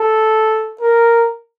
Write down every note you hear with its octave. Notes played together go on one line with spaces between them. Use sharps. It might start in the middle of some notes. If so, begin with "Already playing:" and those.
Already playing: A4
A#4